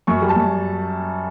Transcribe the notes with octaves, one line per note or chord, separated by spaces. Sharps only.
F#2 C#6
G3
A5
F#2